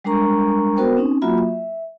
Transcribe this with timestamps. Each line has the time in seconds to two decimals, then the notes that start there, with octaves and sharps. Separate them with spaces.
0.04 G3 G#3 D4 A#4 A#5 C#6
0.77 B3 F#4 A#4 C5 G5
0.97 C4 C#4 D#4
1.22 F#3 A#3 F4 F#4 E5 B5
1.38 E5